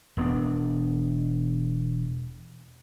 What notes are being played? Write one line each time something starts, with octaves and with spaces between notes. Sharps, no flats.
E1 G2 B3 D4